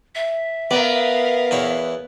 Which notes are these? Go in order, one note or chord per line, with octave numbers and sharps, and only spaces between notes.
E5
B3 A#4 D5 F5
E2 E4 C#5